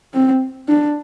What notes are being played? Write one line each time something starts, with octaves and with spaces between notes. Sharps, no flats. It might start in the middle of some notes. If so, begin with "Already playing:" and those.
C4
D4